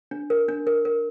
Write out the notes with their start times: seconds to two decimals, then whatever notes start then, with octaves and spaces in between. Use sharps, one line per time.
0.11 D4
0.30 A#4
0.49 D4
0.67 A#4
0.85 A#4